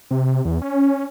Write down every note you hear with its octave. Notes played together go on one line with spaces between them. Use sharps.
C3
E2
C#4